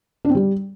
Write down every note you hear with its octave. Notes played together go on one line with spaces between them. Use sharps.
D4
C4
G3